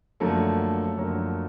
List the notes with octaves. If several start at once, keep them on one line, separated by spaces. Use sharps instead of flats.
F#2 D3 F3 A3 A#3 A4
F#2 D3 F3 A#3